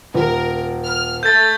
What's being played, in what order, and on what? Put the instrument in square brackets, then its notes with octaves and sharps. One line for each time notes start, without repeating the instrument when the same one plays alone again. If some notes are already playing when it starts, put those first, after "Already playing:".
[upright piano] D#1 [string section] A#4
[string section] F6
[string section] A3 [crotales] G6 A6